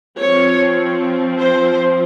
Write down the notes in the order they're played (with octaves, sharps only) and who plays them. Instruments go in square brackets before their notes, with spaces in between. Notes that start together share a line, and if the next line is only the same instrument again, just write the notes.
[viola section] F3 C4 C#5
C5